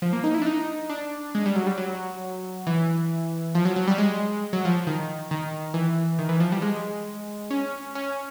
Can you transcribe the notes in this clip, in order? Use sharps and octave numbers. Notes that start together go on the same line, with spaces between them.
F3
A#3
D#4
E4
D4
D#4
D4
G#3
G3
F#3
G3
F#3
E3
F3
F#3
F#3
G3
G#3
F#3
F3
D#3
D#3
E3
D#3
E3
F3
G3
G#3
C#4
C#4